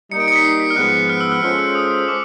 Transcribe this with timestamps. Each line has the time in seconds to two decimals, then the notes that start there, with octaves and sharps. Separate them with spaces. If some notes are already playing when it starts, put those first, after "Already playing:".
0.11 G3 A#3 D#4 C#7
0.20 D7
0.28 C#7
0.36 B6
0.45 C7
0.60 B6
0.70 F6
0.76 G#2 F3 G#3 B3 F#6
1.09 F6
1.21 E6
1.32 F6
1.42 G#3 C#4 F4 A4 C5 F6
1.59 E6
1.75 D#6
2.08 D6